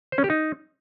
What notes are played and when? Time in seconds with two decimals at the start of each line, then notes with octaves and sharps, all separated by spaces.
0.12 C5
0.18 C#4
0.24 G4
0.30 D#4